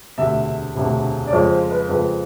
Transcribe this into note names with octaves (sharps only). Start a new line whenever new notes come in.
E1 D2 C3 E5
E1 D2 C3
D5
F2 C#3 F3 G#3 C#5
C5
B4
F2 C#3 F3 G#3 B4